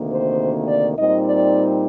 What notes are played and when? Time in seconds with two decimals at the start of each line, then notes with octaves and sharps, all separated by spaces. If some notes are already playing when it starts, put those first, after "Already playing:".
Already playing: D2 C3 D#3 A#3
0.13 C5
0.69 D5
0.97 A#2 G3 C4 D#4 D#5
1.25 D5